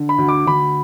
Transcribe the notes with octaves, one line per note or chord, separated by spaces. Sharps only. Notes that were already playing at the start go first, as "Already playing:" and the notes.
Already playing: D3
B5
D2
D6
D2 B5